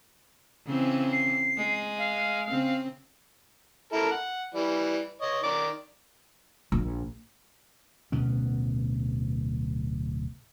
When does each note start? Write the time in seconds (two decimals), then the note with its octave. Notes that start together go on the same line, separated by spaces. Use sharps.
0.66 C#3 E3 C4
1.12 C7
1.57 G#3
1.99 F5
2.50 C#3 C4
3.93 E4 A4 A#4
4.11 F#5
4.54 E3 G3
5.22 C#5 D#5
5.43 D#3 D5
6.72 A#1
8.12 D1 B2 B3 C#4